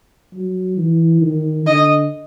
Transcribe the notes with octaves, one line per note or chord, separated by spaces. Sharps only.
F#3
E3
D#3
D3 D#5